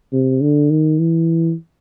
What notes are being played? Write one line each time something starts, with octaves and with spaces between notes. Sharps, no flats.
C3
D3
D#3
E3